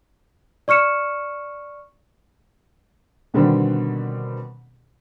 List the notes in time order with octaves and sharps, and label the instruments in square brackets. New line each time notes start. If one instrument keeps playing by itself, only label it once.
[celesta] D5 C#6 F6 C#7 E7
[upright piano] B2 D3 D#3 G3 B3 C4